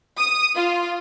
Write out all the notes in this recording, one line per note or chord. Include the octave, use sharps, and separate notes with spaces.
D#6
F4